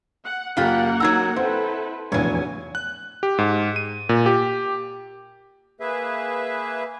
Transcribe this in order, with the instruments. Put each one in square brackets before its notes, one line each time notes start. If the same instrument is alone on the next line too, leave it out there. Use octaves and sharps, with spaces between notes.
[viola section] F#5
[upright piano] F#2 [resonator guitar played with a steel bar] C#3 F4 G4 [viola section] A#3 A#4 F#5
[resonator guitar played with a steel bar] F#3 D#4 A#5 [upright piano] E6 G#6
[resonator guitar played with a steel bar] C4 [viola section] E4 A4 B4 [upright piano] C5 F#5
[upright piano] F1 A#1 E2 [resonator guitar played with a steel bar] F#3 C#5 [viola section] G#5
[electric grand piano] F#6
G4
G#2
D#7
A#2
G4
[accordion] A#3 G#4 B4 E5